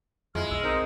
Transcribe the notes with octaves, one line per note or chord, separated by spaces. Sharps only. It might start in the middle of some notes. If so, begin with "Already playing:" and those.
F2 G#3 E4 F4 F6
B1 E6
C4 D#4 A#4